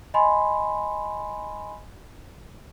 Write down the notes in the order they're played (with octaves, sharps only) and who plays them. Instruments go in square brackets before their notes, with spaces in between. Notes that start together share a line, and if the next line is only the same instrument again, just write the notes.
[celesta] D#5 G#5 B5 C6